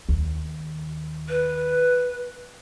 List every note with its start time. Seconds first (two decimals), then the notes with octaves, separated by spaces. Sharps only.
0.09 D#2
1.29 B4